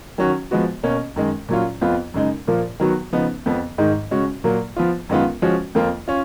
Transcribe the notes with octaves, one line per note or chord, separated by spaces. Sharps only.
D#3 F#3 C#4 F#4
F3 G#3 B3 F#4
B2 A#3 C#4
F#2 D#3 G#3
A#2 F#3 C#4 F4
F2 F3 B3 F4
F#2 C#3 G#3 D#4
A#2 F3 A#3 F4
D#3 F#3 B3 F#4
C#3 F3 B3 D#4
F2 F3 B3
G#2 D#3 G#3 D#4
C#3 G#3 C#4 F#4
A#2 F#3 A#3
F3 B3 F4
F#2 D#3 G#3 B3 F4
F3 G#3 C#4 F#4
F2 F3 A#3 F4
C#4 F4